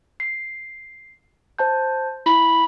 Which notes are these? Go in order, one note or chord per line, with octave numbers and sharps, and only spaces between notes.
C7
C5 A5 G6
E4 B5